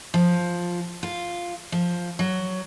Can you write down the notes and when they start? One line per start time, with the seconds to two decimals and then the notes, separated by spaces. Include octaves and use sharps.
0.14 F3
1.03 F4
1.72 F3
2.19 F#3